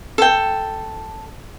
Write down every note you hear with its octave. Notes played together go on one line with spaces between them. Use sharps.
A4 G5